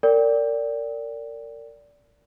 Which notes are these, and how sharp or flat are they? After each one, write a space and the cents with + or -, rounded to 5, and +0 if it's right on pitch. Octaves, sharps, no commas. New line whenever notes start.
A#4 -30 D5 -20 G5 +0